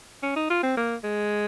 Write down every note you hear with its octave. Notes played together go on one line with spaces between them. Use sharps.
C#4
D#4
F4
C4
A#3
G#3